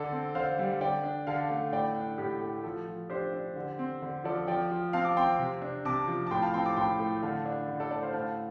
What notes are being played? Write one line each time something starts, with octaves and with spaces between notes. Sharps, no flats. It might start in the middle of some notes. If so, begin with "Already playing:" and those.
Already playing: D3 A4 D5
C4
D3 C5 F5
G3
D3 D5 G5
D4
D3 F5 A5
A3
A2 D5 G5
D4
A2 G4
A3
F3 A4
F3
D4 G4 C5
D4
D3
C4
D3
F3 A4 D5
F3 D5 G5
F3
C4 F5 A5
A5 D6
C4 G5 C6
C3
D4
C3 A5 D6
F3
A5
A2 G5 C6
F5 A5
C4 G5 C6
A5 D6
A2 G5 C6
A3
D3 F5 A5
D4
D3
A4 D5
A3 A4 D5
C5 F5
A2 F5 A5